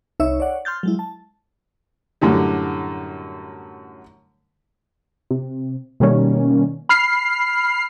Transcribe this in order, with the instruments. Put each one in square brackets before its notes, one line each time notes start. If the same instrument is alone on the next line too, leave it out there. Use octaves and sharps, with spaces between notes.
[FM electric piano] C2 D#4 C#5 E5 E6
C#5 D5 F#5
C6 F6 G6 A6
F#3 G#3 E4
A5
[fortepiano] F#2 A2 D3 G3
[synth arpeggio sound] C3
B2 D#3 G3 A#3 C#4
B5 F6 C7